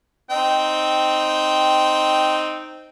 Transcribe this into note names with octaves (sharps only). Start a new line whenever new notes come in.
C4 D#4 G5